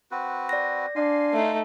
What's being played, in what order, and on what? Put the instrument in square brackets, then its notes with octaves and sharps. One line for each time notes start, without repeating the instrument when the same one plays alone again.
[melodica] C4 F#4 B4
[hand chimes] D5 A#6
[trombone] D4 [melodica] F5 G#5 C6
[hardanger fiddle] A3 D#4